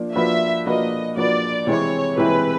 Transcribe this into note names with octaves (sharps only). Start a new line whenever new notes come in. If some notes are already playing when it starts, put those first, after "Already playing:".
Already playing: F3 A#3 D4
F3 A#3 D4 F#4 B4 E5
F3 A#3 D4 F#4 B4 D#5
F3 A#3 D4 F#4 B4 D5
C3 E3 G#3 C4 E4 C#5
C3 E3 G#3 C4 E4 B4